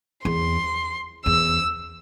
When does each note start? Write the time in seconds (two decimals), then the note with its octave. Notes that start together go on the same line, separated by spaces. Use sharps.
0.25 E2 C6
1.26 E2 E6